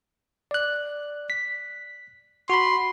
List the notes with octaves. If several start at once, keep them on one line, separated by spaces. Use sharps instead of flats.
D5 F#6
B6
F#4 B5 C6